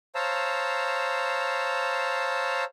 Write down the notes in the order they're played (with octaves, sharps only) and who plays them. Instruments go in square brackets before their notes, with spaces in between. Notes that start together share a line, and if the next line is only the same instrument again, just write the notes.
[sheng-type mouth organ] C5 C#5 F5 A5 A#5 E6